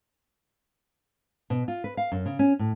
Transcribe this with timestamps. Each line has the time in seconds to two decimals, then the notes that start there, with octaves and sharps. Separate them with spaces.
1.50 B2
1.68 F4
1.84 B4
1.97 F5
2.12 F#2
2.26 C#3
2.39 C#4
2.59 A2